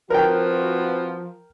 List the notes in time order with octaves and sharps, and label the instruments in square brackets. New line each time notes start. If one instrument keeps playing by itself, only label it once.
[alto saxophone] F3 [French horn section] C4 E4 F#4 [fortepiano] A#4 G5 [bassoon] B4